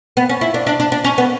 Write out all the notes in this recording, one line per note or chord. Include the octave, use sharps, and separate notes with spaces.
B3
C#4
E4
D4
D4
D4
D4
C#4
B3